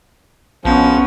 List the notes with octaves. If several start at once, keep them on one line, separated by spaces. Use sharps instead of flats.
A#1 F3 B3 C#4